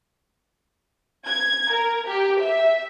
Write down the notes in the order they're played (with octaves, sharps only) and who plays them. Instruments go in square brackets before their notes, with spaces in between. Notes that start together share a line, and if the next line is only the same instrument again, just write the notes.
[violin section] G#6
A#4
G4
E5